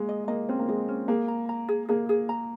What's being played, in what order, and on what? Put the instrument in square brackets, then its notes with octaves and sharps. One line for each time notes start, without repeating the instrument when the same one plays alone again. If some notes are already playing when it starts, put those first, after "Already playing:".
Already playing: [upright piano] G#3 A#3
[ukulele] D#5
[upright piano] A#3 [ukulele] D#5
[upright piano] C4 [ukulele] C#4
[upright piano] A#3
[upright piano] G#3 [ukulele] D#5
[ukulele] C#4
[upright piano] A#3 [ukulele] G#4
[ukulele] A#5
A#5
G#4
[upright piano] A#3 [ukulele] G#4
[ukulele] G#4
A#5